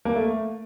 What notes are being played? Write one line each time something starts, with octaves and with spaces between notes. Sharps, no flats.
A#3
A3